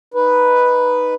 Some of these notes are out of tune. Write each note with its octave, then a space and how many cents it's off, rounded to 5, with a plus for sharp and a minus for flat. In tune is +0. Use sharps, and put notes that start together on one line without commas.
D#4 +0 B4 +0